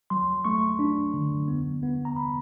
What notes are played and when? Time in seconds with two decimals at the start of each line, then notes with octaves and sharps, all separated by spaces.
0.10 F#3 C6
0.45 A3 C#6
0.79 D4
1.14 D3
1.48 B3
1.83 B3
2.05 A#5
2.17 B5